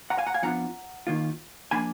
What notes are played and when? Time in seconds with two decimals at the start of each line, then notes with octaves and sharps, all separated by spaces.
0.10 F#5 A#5
0.18 F5 G#5
0.27 F#5 A#5
0.34 F5 G#5
0.42 F2 F3 B3 D4 F4 F#5 A#5
1.07 D#2 D#3 A#3 F4
1.71 F3 A#3 D4 G#5 B5